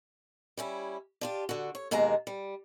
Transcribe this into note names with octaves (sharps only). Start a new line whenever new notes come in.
G3 C#4 E4
D4 F4 G4
D3 F#4
C#5
D#2 B2 G#3 A#3 A#5
G3